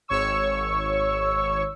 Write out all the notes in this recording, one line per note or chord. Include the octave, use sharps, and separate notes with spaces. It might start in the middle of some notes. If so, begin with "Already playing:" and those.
G#1 C#5 C#6 E6